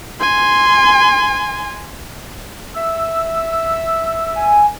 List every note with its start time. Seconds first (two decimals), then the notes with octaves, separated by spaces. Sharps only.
0.20 G#5 C6
2.75 E5 E6
4.36 G#5